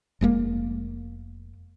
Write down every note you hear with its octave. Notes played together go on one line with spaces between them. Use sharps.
F1 G#3 A#3